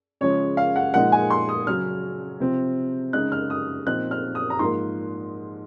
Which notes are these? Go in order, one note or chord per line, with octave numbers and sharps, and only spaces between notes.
C#3 F3 G#3 C#5
F5
F#5
A#2 F3 G#3 D#4 F#5
G#5
C6
D#6
C#3 F#3 C#4 F6
C3 F3 C4
C#3 G#3 D#4 F#6
F6
D#6
A#2 F3 C4 D#4 F#6
F6
D#6
A#5
G#2 F3 A#3 C6